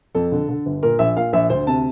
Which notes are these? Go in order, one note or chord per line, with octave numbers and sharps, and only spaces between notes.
F2 A4
D3
D3
G1
A#2 A#4
A#1 E5
A#2 F5
A#1 E5
D2 C5
C3 A5